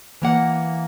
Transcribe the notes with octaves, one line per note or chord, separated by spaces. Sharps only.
E3 A#3 F#5